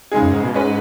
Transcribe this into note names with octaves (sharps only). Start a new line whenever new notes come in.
C#3 G#3 D#4 G#4
F#2
G#2
B2
G#2 G#3 C#4 B4